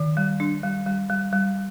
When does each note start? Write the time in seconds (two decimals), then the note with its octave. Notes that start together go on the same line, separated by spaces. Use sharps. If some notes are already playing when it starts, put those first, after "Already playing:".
Already playing: D#3
0.17 G3
0.40 D4
0.63 G3
0.86 G3
1.10 G3
1.33 G3